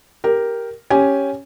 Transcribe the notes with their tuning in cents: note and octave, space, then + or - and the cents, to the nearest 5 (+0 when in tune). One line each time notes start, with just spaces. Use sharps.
G4 +0 A#4 +0
C#4 +0 G4 +0 G#5 +0